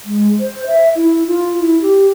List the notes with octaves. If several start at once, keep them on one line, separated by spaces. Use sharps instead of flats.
G#3
C5
E5
E4
F4
E4
G4